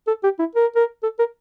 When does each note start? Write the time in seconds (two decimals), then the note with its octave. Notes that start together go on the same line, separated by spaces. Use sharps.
0.08 A4
0.23 G4
0.39 E4
0.55 A#4
0.76 A#4
1.03 A4
1.19 A#4